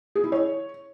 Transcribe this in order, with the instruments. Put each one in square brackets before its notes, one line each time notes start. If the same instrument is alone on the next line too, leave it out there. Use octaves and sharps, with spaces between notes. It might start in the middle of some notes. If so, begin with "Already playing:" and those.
[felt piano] G#4
E4
C#5